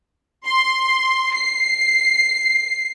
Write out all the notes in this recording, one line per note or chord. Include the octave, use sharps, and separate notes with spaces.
C6
C7